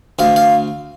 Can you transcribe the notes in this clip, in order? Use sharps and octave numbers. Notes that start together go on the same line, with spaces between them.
D2 F5
F5